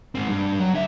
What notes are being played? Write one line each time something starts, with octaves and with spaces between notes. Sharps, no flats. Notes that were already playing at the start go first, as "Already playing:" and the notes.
G#2 C4
G2
F#3
D3 E5